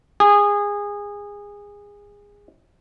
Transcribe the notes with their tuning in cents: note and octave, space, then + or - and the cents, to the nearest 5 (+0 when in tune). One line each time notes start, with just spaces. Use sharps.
G#4 -25